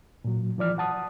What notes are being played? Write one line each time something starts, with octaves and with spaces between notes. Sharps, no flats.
A#2 F#3
E3 F3 D5 F6
F#5 A5 D#6